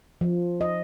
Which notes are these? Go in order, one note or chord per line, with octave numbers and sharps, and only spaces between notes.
F3
D#5